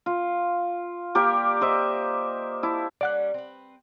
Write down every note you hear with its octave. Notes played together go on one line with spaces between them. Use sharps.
F4
A#3 G4 A#4 D5
C5 D#5 E5
E4 A5
G3 A#3 C#4 D5 F#5 F#6
C4 B4